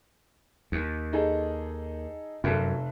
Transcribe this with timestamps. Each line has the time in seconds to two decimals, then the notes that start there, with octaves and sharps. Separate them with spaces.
0.72 D#2
1.13 D#4 G#4 A4
2.44 F1 F#2 A4